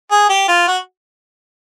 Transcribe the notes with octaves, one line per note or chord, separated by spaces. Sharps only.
G#4
G4
F4
F#4